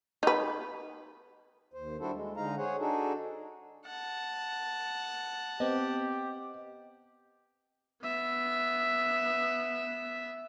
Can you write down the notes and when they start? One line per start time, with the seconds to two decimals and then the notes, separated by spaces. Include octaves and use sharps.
0.23 D#4 B4
1.74 D#2 C5
2.00 G3 D4 E4 F#4 A4 C5
2.13 G#3
2.37 D3 G#3 D#4 F5 A#5
2.57 G#4 C5 C#5 F#5
2.79 D4 D#4 F#4 G#4 A4
3.86 F#5 A5
5.60 B3 C4 G4 D#5
8.03 B3 E5